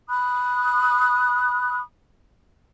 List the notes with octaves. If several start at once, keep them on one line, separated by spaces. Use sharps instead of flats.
B5 D#6 F#6